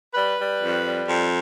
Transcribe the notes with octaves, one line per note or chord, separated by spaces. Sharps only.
G3 B4
G3
F2
G3
F2